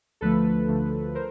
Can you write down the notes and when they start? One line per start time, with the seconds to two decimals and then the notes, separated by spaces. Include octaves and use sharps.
0.21 D2 D3 F3 A3 A4 B4
0.68 D2 D3 F3 A3
1.15 A#4 C5